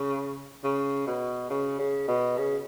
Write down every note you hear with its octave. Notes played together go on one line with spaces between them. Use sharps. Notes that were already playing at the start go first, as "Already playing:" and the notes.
Already playing: C#3
C#3
B2
C#3
C#3
B2
C#3